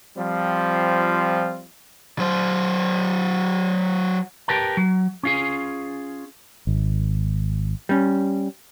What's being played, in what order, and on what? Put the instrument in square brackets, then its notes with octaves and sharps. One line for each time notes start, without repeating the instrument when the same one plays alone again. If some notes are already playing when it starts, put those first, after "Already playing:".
[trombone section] F3 G3 C4 F4
[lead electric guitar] F#3 C5
[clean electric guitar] G4 A#4 B4 A5
F#3
C#4 F4 G#4
[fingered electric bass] G#1
[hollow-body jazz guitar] G3 C#4